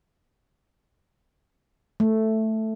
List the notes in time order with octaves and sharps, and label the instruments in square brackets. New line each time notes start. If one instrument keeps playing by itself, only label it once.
[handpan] A3